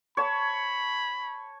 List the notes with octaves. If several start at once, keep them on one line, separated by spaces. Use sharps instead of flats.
C#5 A5 B5